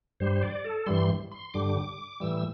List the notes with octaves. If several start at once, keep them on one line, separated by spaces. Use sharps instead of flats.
G2 G3 C5
D5
A4
G2 E3 G3 C6
C6
G2 D3 G3 D6
A2 E3 G3 E6